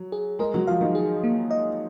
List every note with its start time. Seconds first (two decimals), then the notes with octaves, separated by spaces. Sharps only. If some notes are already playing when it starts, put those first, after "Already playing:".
Already playing: F#3
0.12 G#4
0.39 G#3 A#4
0.54 F#3
0.67 F3 F5
0.81 D#3
0.95 G#4
1.24 A#3
1.51 D#5